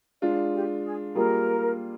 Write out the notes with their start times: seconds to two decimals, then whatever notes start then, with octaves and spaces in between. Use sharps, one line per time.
0.22 G#3 D4 F4 D5
0.54 G4
0.84 G#4
1.15 G3 A#3 F4 G#4 A#4